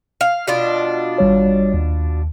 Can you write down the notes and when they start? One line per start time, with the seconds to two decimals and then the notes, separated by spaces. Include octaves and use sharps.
0.21 F5
0.48 B2 D4 F4
1.18 G#1 G3 C#5
1.74 D#2